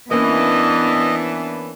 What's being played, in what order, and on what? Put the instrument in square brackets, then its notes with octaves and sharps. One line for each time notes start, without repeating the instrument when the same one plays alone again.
[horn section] E3 [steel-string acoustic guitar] A#3 C#4 [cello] B3 D4 [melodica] D#5